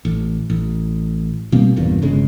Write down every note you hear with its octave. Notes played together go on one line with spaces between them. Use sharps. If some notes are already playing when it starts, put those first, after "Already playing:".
A1
A1
B2 G3 A#3 C4
F#1 E2 G2 A#2
G1 C#3 G#3